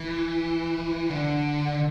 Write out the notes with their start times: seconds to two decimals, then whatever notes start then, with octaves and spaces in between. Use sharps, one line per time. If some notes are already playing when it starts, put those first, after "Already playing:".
Already playing: E3
1.10 D3